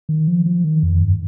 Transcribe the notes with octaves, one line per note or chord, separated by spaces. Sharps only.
D#3
F3
F3
D#3
F2
G2